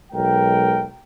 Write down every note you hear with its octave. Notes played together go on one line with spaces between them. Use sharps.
B1 G#3 A#4 G5